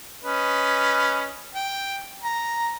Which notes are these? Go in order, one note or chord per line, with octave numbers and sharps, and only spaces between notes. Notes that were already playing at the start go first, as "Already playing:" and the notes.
C#4 B4 D#5
G5
A#5